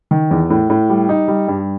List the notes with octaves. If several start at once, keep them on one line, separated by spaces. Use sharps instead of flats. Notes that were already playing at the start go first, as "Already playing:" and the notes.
D#3
E2
A2
A2
G3
D#4
G3
G2